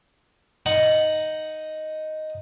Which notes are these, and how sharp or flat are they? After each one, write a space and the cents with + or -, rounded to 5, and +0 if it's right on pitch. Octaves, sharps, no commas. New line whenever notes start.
D#4 +0 F#5 +0